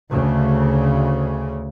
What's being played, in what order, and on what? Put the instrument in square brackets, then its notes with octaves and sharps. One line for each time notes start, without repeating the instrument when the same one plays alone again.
[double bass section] D2 C#3